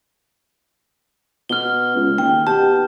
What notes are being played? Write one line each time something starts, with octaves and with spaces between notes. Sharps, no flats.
B2 F6 G7
C#2
D#2 G5
B2 G4 A5